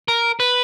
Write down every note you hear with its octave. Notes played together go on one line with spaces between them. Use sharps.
A#4
B4